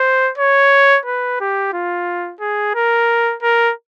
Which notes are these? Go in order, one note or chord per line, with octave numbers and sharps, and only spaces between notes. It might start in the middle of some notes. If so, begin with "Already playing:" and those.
Already playing: C5
C#5
B4
G4
F4
G#4
A#4
A#4